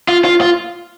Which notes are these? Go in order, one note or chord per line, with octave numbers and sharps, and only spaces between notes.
F4
F4
F4